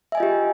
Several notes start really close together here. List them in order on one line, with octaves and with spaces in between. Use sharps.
E5 G#5 D#5 F4 G4